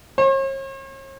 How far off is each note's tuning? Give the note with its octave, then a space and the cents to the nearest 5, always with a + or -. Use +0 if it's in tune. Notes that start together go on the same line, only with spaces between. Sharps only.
C#5 -45